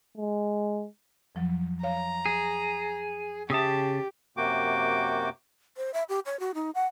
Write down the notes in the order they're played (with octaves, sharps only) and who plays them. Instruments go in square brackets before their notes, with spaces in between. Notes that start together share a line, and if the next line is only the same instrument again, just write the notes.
[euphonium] G#3
[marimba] F2 F3 F#3
[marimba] C#5 F5 [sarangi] A#5
[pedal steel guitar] G#4
[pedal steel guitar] C#3 A5 [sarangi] G4 [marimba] E5 D#6 E6
[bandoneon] F#2 C3 A#3 F#4 G5 D6
[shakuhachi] C5
E5
G4
C#5
F#4
D#4
F#5